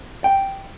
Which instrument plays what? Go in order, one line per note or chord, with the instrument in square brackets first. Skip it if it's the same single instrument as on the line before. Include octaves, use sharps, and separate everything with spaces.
[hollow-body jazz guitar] G5